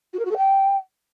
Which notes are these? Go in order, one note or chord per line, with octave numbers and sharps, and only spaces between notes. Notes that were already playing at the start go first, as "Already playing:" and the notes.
F#4
A#4
F#4
A4
G5